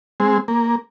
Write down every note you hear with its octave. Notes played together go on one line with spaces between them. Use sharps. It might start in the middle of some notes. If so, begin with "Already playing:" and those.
G#3 C4
A#3